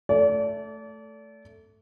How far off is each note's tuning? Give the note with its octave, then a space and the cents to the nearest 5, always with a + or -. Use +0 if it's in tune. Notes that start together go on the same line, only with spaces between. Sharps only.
A3 +0 D5 -35